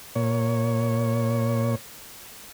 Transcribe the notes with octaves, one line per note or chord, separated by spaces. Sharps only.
A#2 C#5